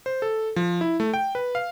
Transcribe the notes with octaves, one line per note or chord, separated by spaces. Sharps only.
C5
A4
F3
E4
A3
G5
B4
F5